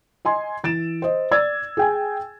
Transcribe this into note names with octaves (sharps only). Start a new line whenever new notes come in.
D#5 G#5 C6
E3 A6 D7 E7
C5 D#5
D5 E6 G#6 A6
G#4 G5 G#5